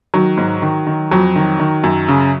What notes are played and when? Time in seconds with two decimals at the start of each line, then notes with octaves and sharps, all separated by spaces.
0.14 D#3 F#3
0.37 G#2
0.62 D#3
0.87 D#3
1.11 F2 F#3
1.36 D#3
1.59 D#3
1.84 F#2
2.08 C#3